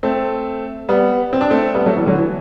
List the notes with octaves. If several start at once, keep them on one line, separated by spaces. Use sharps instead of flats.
A3 C4
G3 B3
C4
D4
A3 C4
G3 B3
F#3 A3
E3 G3
D3 F#3
E3